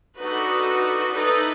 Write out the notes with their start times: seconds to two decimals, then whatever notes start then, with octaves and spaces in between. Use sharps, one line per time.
0.20 D4 D#4 F#4 A4 B4
1.13 D#4 E4 A4 B4 D5